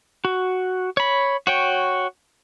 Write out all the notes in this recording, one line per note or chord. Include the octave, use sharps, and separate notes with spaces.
F#4
C#5 B5
F#4 C#5 G5